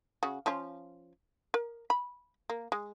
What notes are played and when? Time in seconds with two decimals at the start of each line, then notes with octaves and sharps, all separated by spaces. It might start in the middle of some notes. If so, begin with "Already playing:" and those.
0.23 C#3 F#4
0.46 F3 C#4 F4
1.54 A#4
1.90 B5
2.50 A#3
2.72 G#3